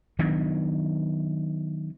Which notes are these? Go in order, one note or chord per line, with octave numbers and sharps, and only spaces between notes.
D#3 F#3 B3 D4